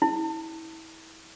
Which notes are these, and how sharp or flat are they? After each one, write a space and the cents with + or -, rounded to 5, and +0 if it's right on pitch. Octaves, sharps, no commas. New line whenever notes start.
E4 -30